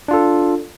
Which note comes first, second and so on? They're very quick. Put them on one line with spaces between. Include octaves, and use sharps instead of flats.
D4 F4 A4